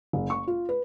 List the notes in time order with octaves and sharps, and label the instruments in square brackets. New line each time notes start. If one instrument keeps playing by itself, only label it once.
[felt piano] F#1
C#6
F4
B4